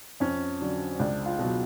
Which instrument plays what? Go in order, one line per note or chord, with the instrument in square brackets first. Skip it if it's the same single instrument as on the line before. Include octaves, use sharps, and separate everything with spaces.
[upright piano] F2 C#4
D3 F#3
C#2 D4
F4
B2 F#3